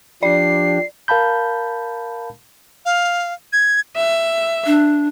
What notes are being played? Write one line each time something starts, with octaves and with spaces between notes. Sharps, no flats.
F3 D4 G4 D5 C7
A#4 F5 A5 B5 G6
F5
G#6
E5
D4